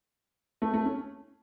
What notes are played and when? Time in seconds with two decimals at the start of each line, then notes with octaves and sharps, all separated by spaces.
0.62 A3
0.74 A3
0.85 C#4